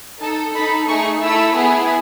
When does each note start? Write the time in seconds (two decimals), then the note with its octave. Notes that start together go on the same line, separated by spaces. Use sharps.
0.20 D#4 A4 A5
0.55 D#4 A4 B5
0.88 A3 D#4 G#4 C#6
1.22 A3 E4 A4 E6
1.56 B3 E4 G#4